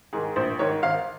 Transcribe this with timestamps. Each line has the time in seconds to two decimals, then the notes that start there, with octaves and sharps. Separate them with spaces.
0.13 G#2 D#3 G#4
0.36 A#1 C5
0.59 G#2 D#3 C#5
0.83 G#1 F5